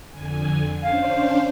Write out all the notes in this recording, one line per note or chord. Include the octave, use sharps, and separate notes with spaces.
F2 D3 G#5
C#4 D4 C5 F5